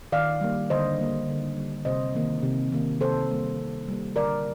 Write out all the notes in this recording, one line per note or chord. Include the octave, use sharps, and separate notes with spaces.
D#3 D5 F5
G3 A#3
D3 C5 D#5
G3 A#3
D3
G3 A#3
C3 C5 D#5
D#3 A#3
C3
D#3 A#3
C3 A4 C5
G3 A#3
C3
G3 A#3
D3 A#4 D5